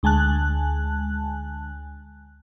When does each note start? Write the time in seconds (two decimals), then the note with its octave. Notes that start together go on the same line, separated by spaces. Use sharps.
0.03 D2 G#3 G#5 A5 F#6